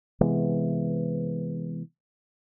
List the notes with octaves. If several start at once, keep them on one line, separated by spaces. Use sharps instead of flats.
C3 E3 G#3 B3